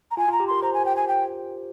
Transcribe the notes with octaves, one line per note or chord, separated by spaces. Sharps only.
A#5
F4 G#5
F4
A#5
G4
A#4 C6
C5 A#5
G#5
G5
G#5
G5